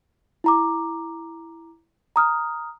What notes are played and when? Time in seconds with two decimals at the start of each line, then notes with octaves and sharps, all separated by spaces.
0.44 E4 A#5 D6
2.16 A#5 D#6 F6